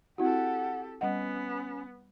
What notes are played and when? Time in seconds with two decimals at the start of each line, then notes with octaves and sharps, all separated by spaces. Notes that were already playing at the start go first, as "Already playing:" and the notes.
0.18 C4 E4 F#4 G4 A4 F#5
1.01 G3 B3 C#4 D#5 F#5